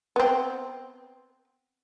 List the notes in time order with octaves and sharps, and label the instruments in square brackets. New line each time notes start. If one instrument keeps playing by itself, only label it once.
[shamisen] B3 C4